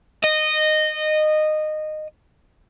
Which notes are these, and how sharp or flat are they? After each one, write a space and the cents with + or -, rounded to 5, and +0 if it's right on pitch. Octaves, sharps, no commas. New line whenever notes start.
D#5 -15